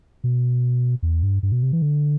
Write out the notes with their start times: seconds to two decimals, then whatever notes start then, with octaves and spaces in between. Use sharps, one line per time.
0.24 B2
1.03 E2
1.23 G2
1.43 G2
1.52 B2
1.63 C3
1.72 E3
1.82 D3